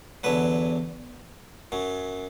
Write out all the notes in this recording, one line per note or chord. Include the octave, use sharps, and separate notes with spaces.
E2 D3 F#3 B4
F#2 F#3